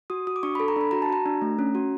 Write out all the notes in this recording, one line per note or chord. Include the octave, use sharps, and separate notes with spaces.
F#4 D#6
F#4 D#6
D6
D4 C#6
A4 B5
A#5
D4 B5
F#4 A#5
A5
F#4 A#5
D4
A3
C#4
F#4